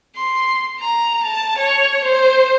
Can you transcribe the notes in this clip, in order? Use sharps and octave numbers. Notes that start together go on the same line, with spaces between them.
C6
A#5
A5
C#5
C5